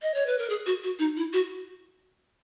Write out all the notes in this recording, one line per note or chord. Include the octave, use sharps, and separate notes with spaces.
D#5
C#5
B4
A#4
G#4
F#4
F#4
D#4
E4
F#4